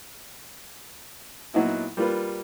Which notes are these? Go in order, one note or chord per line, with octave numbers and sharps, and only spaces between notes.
A#2 F#3 B3 D#4 E4
G3 A#3 F4 B4